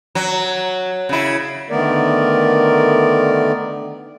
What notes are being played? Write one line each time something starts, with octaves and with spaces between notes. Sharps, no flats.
F#3
C#3 E4
D3 D#3 A3 B3 A#4 D5